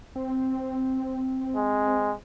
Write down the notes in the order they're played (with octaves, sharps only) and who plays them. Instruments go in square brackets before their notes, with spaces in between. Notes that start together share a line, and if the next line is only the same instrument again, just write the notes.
[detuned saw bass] C4
[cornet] G#3